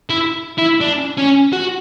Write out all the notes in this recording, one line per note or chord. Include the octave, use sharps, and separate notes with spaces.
E4
E4
D4
C#4
F#4